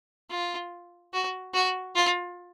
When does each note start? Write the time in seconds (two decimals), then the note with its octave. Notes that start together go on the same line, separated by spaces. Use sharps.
0.31 F4
1.13 F#4
1.54 F#4
1.95 F4